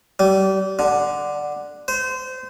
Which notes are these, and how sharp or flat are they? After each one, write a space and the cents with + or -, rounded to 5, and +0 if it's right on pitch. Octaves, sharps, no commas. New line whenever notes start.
G3 -30
D3 +5
C5 -25